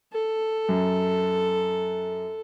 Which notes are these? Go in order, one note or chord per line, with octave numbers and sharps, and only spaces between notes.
A4
F#2